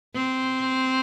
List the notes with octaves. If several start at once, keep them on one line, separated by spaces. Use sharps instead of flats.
C4